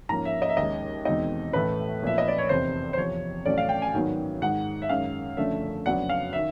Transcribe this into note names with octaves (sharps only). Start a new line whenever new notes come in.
G#2 F3 A#3 C#4 A#5
E5
D#5
E5
D#2 D#3 G#3 C#4 D#5
E2 B2 G#3 C4 D#4 D#5
A1 A2 E3 A3 B4
B1 A#2 F3 E5
D#5
D5
C#5
F1 E2 C3 C5
C5
E2 C3 F3 C#5
A1 A2 F#3 A3 C#4 D5
F5
G5
G#5
G#2 D#3 F#3 B3
G#2 D#3 G#3 F#5
E5
F#2 D#3 G#3 F5
F#1 F#2 D3 F3 A3 E5
F2 C#3 F#3 B3 D4 F#5
F5
D#3 E5